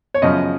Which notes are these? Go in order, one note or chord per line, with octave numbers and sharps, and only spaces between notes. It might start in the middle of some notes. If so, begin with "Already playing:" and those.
C#5
F#2 C#3 F3 D#5